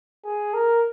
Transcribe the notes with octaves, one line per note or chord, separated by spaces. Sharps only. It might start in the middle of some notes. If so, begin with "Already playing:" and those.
G#4
A#4